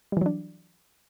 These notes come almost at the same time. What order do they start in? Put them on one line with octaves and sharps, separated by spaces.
G3 E3 F#3 D4